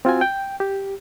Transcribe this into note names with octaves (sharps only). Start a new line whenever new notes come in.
C4 F4 F#4 G#5
G5
G4